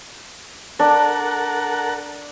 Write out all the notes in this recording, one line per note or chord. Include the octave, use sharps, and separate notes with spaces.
D4 A4 A#4 F#5